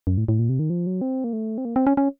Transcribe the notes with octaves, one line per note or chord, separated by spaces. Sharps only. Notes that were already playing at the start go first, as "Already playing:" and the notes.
F#2
A2
A2
A#2
C3
D#3
F3
F#3
C4
A#3
A3
C4
A#3
C4
C#4
C#4